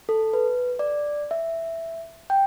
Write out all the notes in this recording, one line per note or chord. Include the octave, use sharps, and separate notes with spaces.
A4
B4
D5
E5
G5